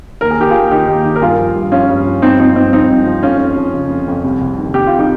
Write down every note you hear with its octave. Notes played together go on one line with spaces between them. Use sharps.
D#2 A#4
G#4
D#3 G4
F4 G#4
D#2
D#3 D#4 G4
D#2
D#3
A#4
G2 F4 G#4
F3
G2
F3 C#4 F4
G2
F3
G2 C4 D#4
F3 C4 D#4
G2 C4 D#4
F3 C4 D#4
G2
F3
F2 C#4 F4
F2
F3
C#3
F2
F2
C2
C2
D#3
C3 G4
F4
D#4 G4